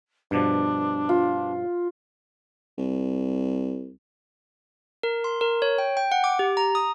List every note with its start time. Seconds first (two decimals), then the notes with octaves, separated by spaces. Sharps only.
0.31 G2 B2 F3 D4
1.09 F4
2.78 C2
5.03 A#4
5.24 C6
5.41 A#4
5.62 C#5
5.78 G5
5.97 G5
6.12 F#5
6.24 D6
6.39 G4
6.57 A#5
6.75 D#6